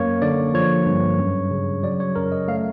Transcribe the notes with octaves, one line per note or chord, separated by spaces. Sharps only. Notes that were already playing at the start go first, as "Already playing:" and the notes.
Already playing: F#2 A#3 C#5
D3 D5
F3 C#5
G2
F#2
C#3
F#3 D5
C#5
F#2 A#4
D#5
A3 F5